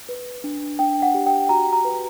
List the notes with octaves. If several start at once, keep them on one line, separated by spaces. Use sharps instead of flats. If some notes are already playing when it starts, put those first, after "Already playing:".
B4
D4
D4 G5
F#5
G4
G5
F#4 A#5
A#5
B4